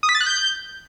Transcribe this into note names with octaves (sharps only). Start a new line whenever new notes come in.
D#6
B6
A6
F#6
G6